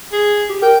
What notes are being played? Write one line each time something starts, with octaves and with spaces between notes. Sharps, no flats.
G#4
G4
A#4 G5